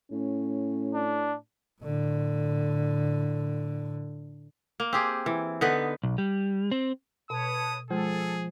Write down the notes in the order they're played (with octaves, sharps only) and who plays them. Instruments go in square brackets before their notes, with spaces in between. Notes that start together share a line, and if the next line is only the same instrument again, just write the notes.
[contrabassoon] A2 [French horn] C#4
[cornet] D4
[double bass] A2 D3
[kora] A#3
C4 G4 G#4
E3
D3 B3 D#4 B4
[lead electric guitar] B1
G3
C4
[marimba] B2 [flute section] B4 C#5 A5 [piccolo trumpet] D#6
[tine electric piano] F3 [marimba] G#3 [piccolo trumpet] G#4 [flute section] A4